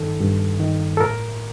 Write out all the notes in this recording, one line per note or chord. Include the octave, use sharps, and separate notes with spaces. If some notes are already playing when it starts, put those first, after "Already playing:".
Already playing: G2 D#3 A4
G2
D#3
A4
A2 A#4